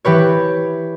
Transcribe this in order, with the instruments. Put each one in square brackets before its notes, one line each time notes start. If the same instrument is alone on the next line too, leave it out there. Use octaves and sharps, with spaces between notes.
[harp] E3 G4 B4 C#5